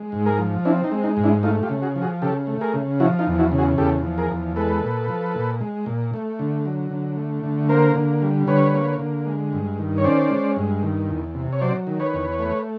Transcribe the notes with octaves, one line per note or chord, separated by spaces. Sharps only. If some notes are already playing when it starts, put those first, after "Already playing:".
Already playing: G#3
G#2
G#4 A#4
F3
C4 D4 E4
D#4
G#3
D#4
G#2
D4 E4
A3 D#4 F4
F4 G4
C#3
F#4 G#4
F3
F#4 G#4
C#3 G4 A4
A3
G#4 A#4
C#3
F3 E4 F#4
D#4 F4
E2
E4 F#4
C#3
F#4 G#4
E2 G4 A4
F3
G#4 A#4
E2
G#3 A4 B4
A#2
F3
A#2
G#3
A#2
A3
D3
F#3
D3
A3
D3
A#3 A#4 C5
D3
G3
D3 B4 C#5
A#3
D3
G#3
G2
D#3
C#5
C#4 C5 D5
G#3
G2
D#3
E2
C3
C#5
F#3 C5 D5
D#3
B4 C#5
E2
A3